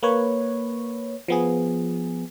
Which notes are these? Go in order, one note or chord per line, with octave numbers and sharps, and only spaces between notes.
A#3 B4 C#5
F3 B3 G#4